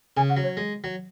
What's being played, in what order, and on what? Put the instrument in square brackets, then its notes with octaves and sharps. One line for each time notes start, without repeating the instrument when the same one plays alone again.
[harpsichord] C#3 [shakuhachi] G#5
[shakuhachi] F#5
[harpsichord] F#3
[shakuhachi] C#5
[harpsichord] G#3
F#3